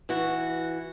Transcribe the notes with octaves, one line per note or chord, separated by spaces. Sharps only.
E3 F#4